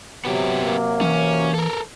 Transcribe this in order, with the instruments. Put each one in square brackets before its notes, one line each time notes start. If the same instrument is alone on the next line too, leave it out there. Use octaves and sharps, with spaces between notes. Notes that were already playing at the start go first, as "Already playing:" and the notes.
[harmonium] C3 F#3 [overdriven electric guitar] B3 G4
[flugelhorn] A#3
[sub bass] E3 [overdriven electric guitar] C#4
[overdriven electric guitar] A4 A#4